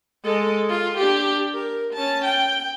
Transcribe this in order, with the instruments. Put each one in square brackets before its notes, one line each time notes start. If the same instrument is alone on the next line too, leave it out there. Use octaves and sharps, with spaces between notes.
[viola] G#3 A4
F4
D4 G4
A#4
C#4 A5
G5